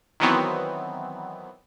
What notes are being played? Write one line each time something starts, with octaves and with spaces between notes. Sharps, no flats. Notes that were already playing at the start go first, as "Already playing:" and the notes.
D#3 E3 F#3 B3 C4